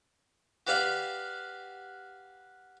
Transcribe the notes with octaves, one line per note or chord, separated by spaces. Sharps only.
F#4 G4 B4 D5 F5 D6